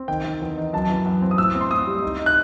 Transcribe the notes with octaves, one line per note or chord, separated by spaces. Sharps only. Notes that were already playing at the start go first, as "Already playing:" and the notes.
Already playing: C4
D#3 G5
D#3
E2
D#4
F#2 A5
E3
F#2
C4
D#6
A2 E6
C4
C6
A2 D#6
G3
D#4
D#4
F#6